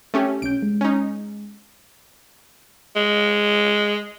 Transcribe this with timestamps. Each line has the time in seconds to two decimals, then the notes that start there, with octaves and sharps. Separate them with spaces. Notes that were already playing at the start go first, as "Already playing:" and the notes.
0.14 A3 C#4 G4
0.42 B1 C#4 G6 D7
0.62 G#3
0.81 C#4 D#4
2.96 G#3